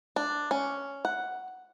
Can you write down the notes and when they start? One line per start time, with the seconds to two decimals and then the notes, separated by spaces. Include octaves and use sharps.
0.16 D4
0.51 C#4
1.05 F#5